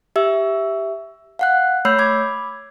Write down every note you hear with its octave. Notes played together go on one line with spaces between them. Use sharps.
G4 E5 E6
F5 F#5 F#6
A3 C#5 B5 E6 G6 C7
B5 D6 G#6